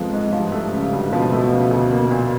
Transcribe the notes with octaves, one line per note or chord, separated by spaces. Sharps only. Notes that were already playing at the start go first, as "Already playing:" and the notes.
Already playing: F2 G#2 F3 G#3 B3
G#2
G2 F3
A3
C#3
D2
B2 F3
A3
C#3
D2
A#3
A#2